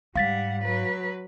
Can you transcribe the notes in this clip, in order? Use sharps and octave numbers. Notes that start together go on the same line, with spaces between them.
G#2 G3 F5 F#5 A6 B6
F#3 B4